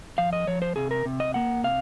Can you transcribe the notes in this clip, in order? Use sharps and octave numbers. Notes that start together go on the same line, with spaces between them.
F3 F5
D#5
F3 C#5
C5
C3 G#4
A#4
C3
D#5
A#3 F#5
C3 F5